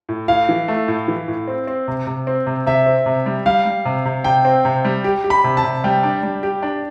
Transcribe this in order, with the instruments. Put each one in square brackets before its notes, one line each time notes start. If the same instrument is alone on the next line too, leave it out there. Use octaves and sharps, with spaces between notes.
[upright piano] A2
[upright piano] A2 [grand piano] F5
[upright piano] E3
A3
A2
E3
A2
C4
C4
C3
C3
C4
C3
[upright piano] C3 [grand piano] E5
[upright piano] C4
C3
G3
[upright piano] G3 [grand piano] F5
[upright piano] G3
C3
C3
[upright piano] C3 [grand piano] G5
[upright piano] C4
C3
G3
G4
G4
[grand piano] B5
[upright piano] C3
[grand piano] A5
[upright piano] C3
[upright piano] G3 [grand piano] G5
[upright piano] D4
G3
G4
D4